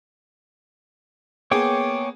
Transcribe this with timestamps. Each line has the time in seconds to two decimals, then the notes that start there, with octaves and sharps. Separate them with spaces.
1.51 A#3 B3 G#4 C#5 G5 D6